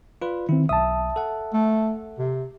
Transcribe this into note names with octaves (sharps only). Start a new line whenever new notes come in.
F4 B4 D5
D#3 C4 E4
B1 E5 A5 D#6
A4 F#5
A3
C3